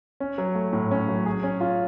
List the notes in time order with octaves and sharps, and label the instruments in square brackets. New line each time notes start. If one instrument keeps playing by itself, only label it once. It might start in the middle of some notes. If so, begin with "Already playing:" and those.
[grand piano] C#4
F#3
A3
A2
C#4
F#3
G#4
C#4
F4